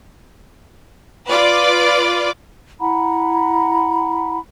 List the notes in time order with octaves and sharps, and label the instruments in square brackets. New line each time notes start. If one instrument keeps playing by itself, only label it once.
[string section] F4 B4 D5 D6
[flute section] E4 F#5 A#5 B5